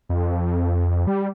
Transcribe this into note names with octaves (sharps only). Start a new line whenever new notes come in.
F2
G3